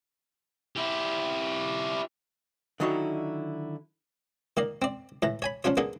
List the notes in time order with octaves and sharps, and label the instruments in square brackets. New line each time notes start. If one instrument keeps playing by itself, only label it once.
[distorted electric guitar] E4 G4
[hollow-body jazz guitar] D3 D#3 F#3 D#4 E4 C#5
[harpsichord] D#3 A#3 D5
C4 D5
A2 E3 A#5
C#5 G#5 B5
F3 C#4 D4 F4 C#5
A#3 B3 D4 G#4 A4